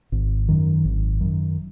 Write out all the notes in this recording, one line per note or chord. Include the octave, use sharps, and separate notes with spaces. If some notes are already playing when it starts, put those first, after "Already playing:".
G#1
F#2 D#3
G#1
F#2 D#3